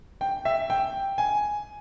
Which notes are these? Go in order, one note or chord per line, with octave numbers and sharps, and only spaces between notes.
G5
E5
G5
G#5